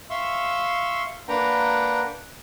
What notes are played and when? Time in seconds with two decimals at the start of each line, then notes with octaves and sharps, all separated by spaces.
0.10 E5 F5 C6 C#6 E6
1.28 A#3 D4 B4 F#5 G5 A#5